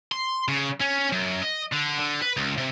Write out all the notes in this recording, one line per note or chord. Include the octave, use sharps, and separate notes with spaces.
C6
C#3
C#4
F#2
D#5
D3
D3
B4
C#2
C3